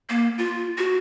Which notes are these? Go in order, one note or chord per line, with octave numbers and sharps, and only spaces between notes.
A#3
F4
F#4